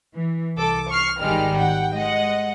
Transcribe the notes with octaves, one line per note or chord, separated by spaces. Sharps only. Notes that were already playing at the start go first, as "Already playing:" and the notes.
E3
C2 A4 D6
C#6 F6 C7
G#1 D#3 G3 G#3 F6
F#5 G5
G#3 D#5 F#5